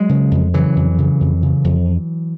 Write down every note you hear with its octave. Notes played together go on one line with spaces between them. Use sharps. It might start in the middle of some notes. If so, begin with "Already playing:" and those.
Already playing: F#3 G#3
C#3
F2
C#3 E3 F#3
F2
C#3
F2
C#3
F2